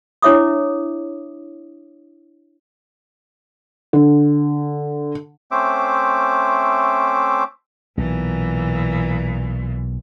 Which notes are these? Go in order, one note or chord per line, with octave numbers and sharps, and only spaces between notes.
D4 E4 C#5 E5 D6 D#6
D3
A3 C4 C#4 C5 E5 D6
B1 A#2 E3